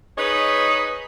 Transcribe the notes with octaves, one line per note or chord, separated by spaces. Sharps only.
D#4 G#4 B4 C#5 D#5